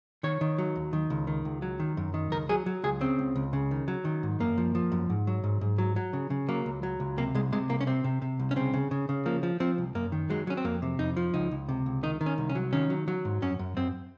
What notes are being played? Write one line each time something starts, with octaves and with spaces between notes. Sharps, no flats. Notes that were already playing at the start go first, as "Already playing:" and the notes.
D#3 C#5
D#3
F#3
D#2
D#3
C#2
D#3
C#2
F#3
D#3
F#2
D#3
C#2 A#4
F#3 G#4
F#3
C#2 G#4
C#3 C4
C#2
C#2
C#3
D#3
F#3
D#3
G#2
F#2 A#3
F3
F3
F#2
G#2
F#3
G#2
G#2
F#3
F#3
C#3
C#3
F#3 A#3
C#2
F#3
C#2
C3 A#3
C2 G#3
C3 G#3
C2 A#3
C#4
C3 C4
C3
C3
C2
C#4
C#3 C4
C#3
C#3
C#3
F3 A#3
F3
F3 C4
C2
F#2 A#3
D#3
F#3 G#3
F#3 C#4
C4
F2 A#3
C3
F2 D#4
F3
C#2 D#4
C#2
C3
C#2
D#3 D#4
D#3
C#4
C2
C#4
F#3
D#3 C#4
F#3
F#3
G#2
F#2 C#4
F#2
F#2 C4